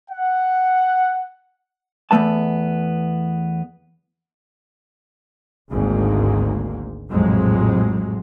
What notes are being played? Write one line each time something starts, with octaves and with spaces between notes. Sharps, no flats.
F#5
E2 F3 A3 B3 A5
G#1 D2 G#2 A#3
A#1 F2 A2 C3 F#3 G#3